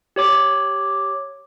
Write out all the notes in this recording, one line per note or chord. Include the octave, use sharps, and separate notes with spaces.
G4 C#5 D6